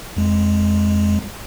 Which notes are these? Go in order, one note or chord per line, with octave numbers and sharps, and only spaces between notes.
F2 G#3